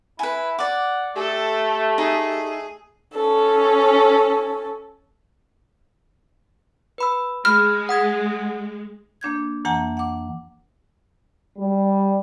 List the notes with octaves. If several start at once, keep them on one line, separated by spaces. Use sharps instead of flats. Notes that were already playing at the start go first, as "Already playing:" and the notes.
E4 B4 G#5
D5 F#5 D6
A3 G4 A4
D#4 G#4
C#4 A4
B4 B5 E6
G#3 B5 F6
F#5 D#6 G#6
A#3 D4 G6 G#6
F2 E3 A#3 F#5 G#5 A#5
F#5 D6
G3